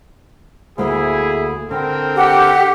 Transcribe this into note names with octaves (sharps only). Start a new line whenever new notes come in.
D2 A#3 E4 G#4
D3 C4 A#4 G5
G4 F#5